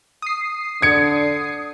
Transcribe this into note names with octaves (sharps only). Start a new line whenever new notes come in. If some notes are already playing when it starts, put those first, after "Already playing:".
D#6 C7
D3 G#6 C#7